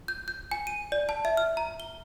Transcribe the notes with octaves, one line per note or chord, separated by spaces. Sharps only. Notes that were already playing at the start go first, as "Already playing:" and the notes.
G6
G6
G#5
D#7
D5
A5
E5
F6
A#5
G7